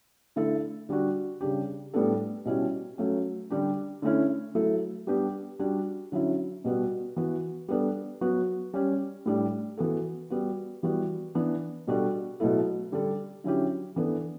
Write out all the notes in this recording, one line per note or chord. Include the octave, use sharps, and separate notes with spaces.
D3 A3 E4 A4
D3 G3 D4 F#4
C#3 G3 D4 G4
A2 G3 B3 D4 A4
B2 G3 C#4 E4 G4
F#3 A3 C#4
D3 G3 D4 G4
D3 A3 C#4 E4
F#3 A3 E4 A4
G3 B3 D4 G4
G3 D4 F#4
D3 F#3 C#4 E4
B2 G3 B3 F#4
E3 B3 F#4
G3 B3 D4 A4
F#3 B3 F#4
G3 C#4 G4
A2 G3 D4
E3 B3 F#4 A4
G3 B3 F#4
E3 G3 B3 F#4
E3 B3 D4
B2 G3 D4 F#4 A4
B2 F#3 A3 E4 A4
D3 G3 D4 A4
D3 F#3 C#4 E4 G4
E3 B3 D4 A4